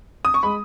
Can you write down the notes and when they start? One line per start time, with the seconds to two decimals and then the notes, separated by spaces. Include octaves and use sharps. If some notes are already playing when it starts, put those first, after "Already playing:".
0.25 D#6
0.34 C#6
0.43 G#3 B5